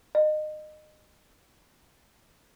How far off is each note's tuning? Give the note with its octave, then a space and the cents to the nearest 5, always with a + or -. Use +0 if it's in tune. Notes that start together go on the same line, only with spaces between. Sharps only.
D#5 -25